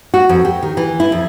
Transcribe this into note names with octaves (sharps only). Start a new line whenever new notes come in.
F#4
F2
G4
D#3
E3
E4
F2